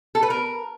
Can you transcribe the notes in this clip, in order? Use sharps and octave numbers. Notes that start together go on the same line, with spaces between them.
A4
B4
A#4